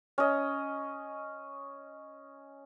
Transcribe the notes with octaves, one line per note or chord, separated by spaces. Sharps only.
C#4 D#5